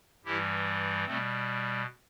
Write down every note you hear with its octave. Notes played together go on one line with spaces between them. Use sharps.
G2 E3 G3 E4 G4
B2 G3 A3 C4